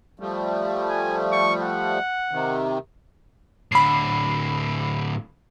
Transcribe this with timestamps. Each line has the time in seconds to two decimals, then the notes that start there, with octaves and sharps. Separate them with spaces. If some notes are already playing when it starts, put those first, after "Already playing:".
0.19 F3 G3 A3
0.90 G#5
1.32 C#6
1.62 F#5
2.31 C3 D#3
3.72 A2 D3 B5 C7